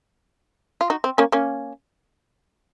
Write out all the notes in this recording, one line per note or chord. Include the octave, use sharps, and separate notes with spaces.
F4
D#4 F#4
C4
A#3 C#4
A#3 C#4